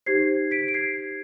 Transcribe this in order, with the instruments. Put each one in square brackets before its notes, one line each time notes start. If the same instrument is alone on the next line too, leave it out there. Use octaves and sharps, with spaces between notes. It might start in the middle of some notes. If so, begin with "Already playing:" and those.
[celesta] D#4 G4 C5 G#6 C7
B6 D7
D7
G#6 C7